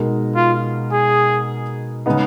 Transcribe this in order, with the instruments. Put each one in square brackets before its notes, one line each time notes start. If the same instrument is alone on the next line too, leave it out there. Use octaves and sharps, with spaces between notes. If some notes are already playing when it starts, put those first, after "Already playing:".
Already playing: [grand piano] B2 G#3 D#4 A#4
[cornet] F4
G#4
[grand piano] C#3 G#3 B3 D#4